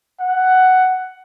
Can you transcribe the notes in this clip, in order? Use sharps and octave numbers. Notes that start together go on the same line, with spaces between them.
F#5